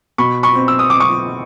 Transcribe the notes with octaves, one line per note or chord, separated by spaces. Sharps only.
B2 B5 C#6
B5 C#6
C4
E6
D#6
C4 D6
C#6 D#6